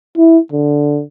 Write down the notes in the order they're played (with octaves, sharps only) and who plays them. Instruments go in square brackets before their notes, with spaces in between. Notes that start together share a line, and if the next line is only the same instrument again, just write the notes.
[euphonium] E4
D3